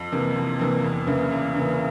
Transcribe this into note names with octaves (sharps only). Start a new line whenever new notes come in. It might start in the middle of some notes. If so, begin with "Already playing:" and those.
Already playing: F2
C3 E3 A#3
F2
C3 E3 A#3
E2
C#3 E3 A#3 E4
E2
C#3 E3 A#3 E4